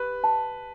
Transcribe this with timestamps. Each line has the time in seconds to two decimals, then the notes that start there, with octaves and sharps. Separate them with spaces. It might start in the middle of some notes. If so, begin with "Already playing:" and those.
Already playing: G4 B4
0.24 A5